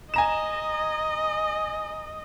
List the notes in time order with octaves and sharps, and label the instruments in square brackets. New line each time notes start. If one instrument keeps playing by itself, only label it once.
[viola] D#5 [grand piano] G#5 A#5 E7